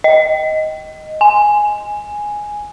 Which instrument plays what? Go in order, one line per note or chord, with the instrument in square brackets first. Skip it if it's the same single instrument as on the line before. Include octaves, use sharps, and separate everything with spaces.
[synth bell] D#5
G#5